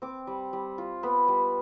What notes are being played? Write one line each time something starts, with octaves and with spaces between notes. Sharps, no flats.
C4 D6
G3
G3
F4
B3 B5
G3